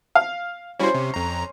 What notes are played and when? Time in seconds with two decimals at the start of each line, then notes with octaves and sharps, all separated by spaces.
0.15 F5
0.79 G3 C#4 E4 F#4 C5
0.94 C3
1.14 F2 A#5